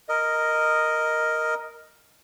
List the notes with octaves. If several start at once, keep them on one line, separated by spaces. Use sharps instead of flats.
A#4 D#5